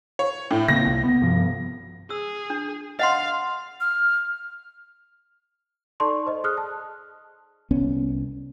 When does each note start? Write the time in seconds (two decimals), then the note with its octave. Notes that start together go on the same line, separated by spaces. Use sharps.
0.19 C#5
0.51 A2
0.68 C#3 A#3 C4 A#6
0.87 C2
1.03 B3
1.22 G2 C3 F3
2.10 G#4 E6
2.50 D4
2.99 D#5 F5 F#5 C6
3.80 F6
6.00 D#4 A4 D5 A5 C6 C#6
6.27 C5 D#5
6.44 G#4 D#6 F6 F#6
6.57 A5
7.71 C2 B3 C#4